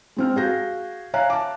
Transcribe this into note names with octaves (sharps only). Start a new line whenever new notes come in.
G#3 C4 F6
F#4 G#4 F5 G6 A#6
C#5 E5 F5 G#5 A#5 F#6
A5 D6